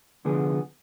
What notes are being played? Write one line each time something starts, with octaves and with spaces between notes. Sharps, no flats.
C2 D3 F3 B3 G#4